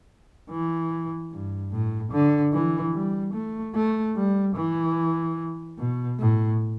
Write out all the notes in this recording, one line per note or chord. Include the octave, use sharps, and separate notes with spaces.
E3
G2
A2
D3
E3
G3
A3
A3
G3
E3
B2
A2